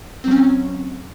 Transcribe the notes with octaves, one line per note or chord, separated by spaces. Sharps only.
F#3 C4 C#4